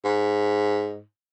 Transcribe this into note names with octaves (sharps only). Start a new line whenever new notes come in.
G#2